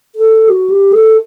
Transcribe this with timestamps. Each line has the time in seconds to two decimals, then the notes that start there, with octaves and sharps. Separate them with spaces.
0.16 A4
0.48 F#4
0.70 G4
0.92 A4